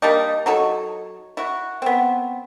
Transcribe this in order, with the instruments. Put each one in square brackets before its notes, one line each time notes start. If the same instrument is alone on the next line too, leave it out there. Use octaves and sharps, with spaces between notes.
[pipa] G3 A#3 D4 D#4
F#3 D#4 A4 C#5
E4 F#4
B3 C4